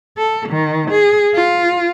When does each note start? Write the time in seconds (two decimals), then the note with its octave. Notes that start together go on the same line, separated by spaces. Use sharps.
0.18 A4
0.49 D#3
0.91 G#4
1.35 F4